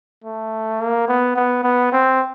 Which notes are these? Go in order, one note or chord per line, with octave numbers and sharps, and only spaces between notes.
A3
A#3
B3
B3
B3
C4